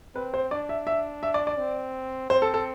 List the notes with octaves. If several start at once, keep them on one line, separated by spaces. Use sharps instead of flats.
C4 B4
C5
D4 D5
E5
E5
E5
D5
D5
C4
C4 C5
A4
A4